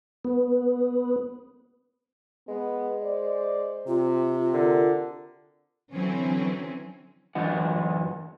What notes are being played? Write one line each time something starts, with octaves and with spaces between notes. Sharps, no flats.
B3
G#3 B3
C5 D5
C3 F4
D3 A#4
D3 E3 F#3 C4 C#4
F#2 E3 D4 F#5